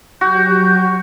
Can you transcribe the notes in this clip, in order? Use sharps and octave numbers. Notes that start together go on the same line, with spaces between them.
F#3 F#4 G4 G6